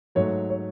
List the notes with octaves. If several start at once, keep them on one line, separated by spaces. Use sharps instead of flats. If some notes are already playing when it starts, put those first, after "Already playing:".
G#2 F#3 A3 C#5
C#5